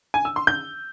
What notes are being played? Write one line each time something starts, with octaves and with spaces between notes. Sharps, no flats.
G#5
E6
C6
G6